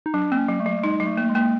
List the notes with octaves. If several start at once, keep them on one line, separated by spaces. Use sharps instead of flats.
D#4
F#3 D4
A#3 C4
C#4
F#3
A3
F#3
G#3 D#4
F#3 G#3
A3
A#3
G#3
A#3